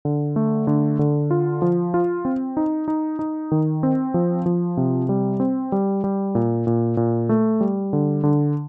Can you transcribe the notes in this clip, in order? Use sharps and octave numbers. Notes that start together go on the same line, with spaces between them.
D3
A3
D3
D3
F4
F3
F4
C4
D#4
D#4
D#4
D#3
C4
F3
F3
C3
G3
C4
G3
G3
A#2
A#2
A#2
A3
G3
D3
D3